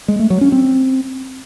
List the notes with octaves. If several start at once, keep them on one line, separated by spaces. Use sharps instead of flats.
G#3
A3
F#3
C#4
C4